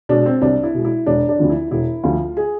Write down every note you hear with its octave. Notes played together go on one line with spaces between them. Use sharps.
B2 G#3 D4
C4
C2 D4
E4
B2 G#3
E4
E1 D4
D4
D2 D3 F3
E4
E1 E4
D2 D3 F3 F4
G#4